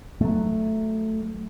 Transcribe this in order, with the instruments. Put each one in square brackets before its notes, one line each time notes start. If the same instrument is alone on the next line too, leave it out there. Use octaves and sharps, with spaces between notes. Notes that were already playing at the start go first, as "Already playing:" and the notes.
[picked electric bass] F#3 A3